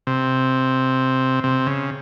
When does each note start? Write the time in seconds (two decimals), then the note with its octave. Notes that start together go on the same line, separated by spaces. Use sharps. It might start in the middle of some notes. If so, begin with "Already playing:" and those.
0.07 C3
1.44 C3
1.67 C#3